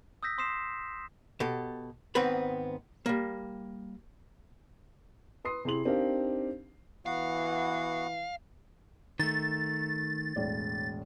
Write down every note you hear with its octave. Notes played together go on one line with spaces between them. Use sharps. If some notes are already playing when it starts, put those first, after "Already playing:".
D#6 E6 G6 A#6 B6
C6 D#6 B6 C7 E7
B2 G4 A4
G#2 D#3 B3 C4 B4 B5
G3 A#3
B4 C6 D#6 C7
C3 E4 G#4 C6 F#7
C4 D4 D#4 G4 A#4 F5
E3 B3 F#4 F5 F#5
D#3 A3 A6
E1 A2 D5